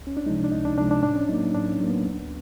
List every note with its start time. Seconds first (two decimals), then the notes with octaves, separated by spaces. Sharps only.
0.01 C#2
0.07 C#4
0.17 D4
0.26 C3 F3 G#3 D#4
0.44 D4
0.52 C#2 D#4
0.65 D4
0.78 C3 F3 G#3 D4
0.91 D4
1.03 A2 D4
1.16 C#4
1.29 F#3 A#3 D#4
1.54 A2 D4
1.72 C#4
1.80 F#3 A#3
1.89 B3
2.06 D2